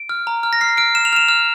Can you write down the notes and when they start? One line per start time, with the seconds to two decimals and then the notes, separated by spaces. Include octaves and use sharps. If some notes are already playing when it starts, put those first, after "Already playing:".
Already playing: D7
0.09 F6
0.27 A#5
0.43 F6
0.53 A#6
0.61 F6 C7
0.77 F6 D7
0.95 F6 E7
1.05 F7
1.13 F6 E7
1.28 F6